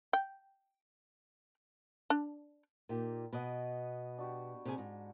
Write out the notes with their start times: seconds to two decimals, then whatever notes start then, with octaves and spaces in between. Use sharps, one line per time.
0.13 G5
2.10 D4
2.89 A#2 D#4 G4
3.33 B2 B4 D#5 F#5
4.18 D4 F#4 G4
4.65 C3 G#4
4.78 G#2